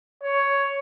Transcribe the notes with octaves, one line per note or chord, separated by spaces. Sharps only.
C#5